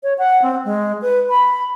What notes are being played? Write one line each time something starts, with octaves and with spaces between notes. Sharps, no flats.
C#5
F#5
C4
G#3
B4
B5